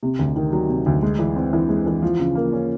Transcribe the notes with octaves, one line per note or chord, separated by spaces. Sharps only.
C3
D2
D#3
F#3
C3
D2
G#3
E3
C4
E3
G#3
E3
F3
C#3
A#3
C#4